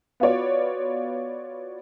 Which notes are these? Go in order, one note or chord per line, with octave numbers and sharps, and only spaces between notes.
B3 F4 F#4 C#5 D5